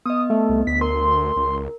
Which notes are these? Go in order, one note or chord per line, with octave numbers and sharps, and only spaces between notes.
B3 D#5 D#6
A3
C2
D2 B6
A#4 C6
C#2